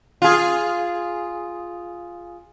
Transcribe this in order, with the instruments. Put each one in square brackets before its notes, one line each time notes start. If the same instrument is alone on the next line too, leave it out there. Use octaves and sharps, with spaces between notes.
[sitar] F4 G#4